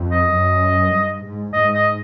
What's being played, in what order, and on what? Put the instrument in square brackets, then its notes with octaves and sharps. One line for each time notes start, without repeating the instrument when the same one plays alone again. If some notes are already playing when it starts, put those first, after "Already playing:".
Already playing: [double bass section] F2
[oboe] D#5
[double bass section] F#2
G2
G#2
[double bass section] G#2 [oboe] D#5
[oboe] D#5